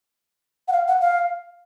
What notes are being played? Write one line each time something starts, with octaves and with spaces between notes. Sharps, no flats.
F#5
F5
F#5
F5